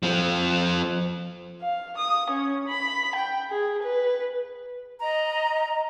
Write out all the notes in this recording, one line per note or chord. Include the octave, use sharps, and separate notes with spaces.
F3 C4
F5
D#6
C#4
B5
G5
G#4
B4
D#5 A#5